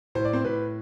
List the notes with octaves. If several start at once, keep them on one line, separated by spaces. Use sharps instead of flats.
A2 C5
D5
C4 C5
A2 B4